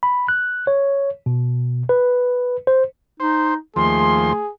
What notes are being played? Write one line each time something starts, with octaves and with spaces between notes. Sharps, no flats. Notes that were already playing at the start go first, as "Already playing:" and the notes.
B5
F#6
C#5
B2
B4
C5
D#4 C5
D#2 F3 A3 G#4 C6